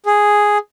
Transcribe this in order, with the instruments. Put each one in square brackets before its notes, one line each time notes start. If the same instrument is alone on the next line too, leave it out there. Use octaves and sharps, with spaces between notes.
[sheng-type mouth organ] G#4